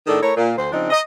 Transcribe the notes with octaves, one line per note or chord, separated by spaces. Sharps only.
A2 D#3 D4 G#4 A4
A3 E4 A#4 C#5
A#2
D2 C5
C#3 F3 C4 D4 D#4
D#5